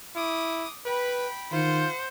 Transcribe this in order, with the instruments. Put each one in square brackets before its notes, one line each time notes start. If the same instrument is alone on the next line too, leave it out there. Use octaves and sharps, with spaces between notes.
[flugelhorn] E4 [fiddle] D6 D#6
[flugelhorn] B4 [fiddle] G5 B5
[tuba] D#3 [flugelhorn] F4 [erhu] C5 [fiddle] F#5